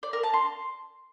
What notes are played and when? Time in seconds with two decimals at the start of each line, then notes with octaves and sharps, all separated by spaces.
0.03 D5
0.13 A#4
0.23 A5
0.34 C6